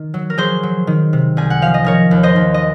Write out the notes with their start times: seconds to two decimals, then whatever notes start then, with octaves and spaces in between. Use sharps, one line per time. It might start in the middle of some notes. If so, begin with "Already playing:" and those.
Already playing: D#3
0.14 F#3
0.30 A#4
0.38 F#3 G#4 C5
0.63 F#3
0.87 D#3
1.13 C3
1.37 C2 G#5
1.50 F#5
1.62 F3 F5
1.74 D#5
1.84 D#3 A#4 C#5
2.11 D#2
2.23 C5 D#5
2.36 D#2
2.54 D#5